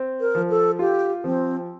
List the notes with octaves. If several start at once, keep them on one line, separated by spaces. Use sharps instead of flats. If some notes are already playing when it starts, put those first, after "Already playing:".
Already playing: C4
A#4
F3
A4
F4 G4
F3 C4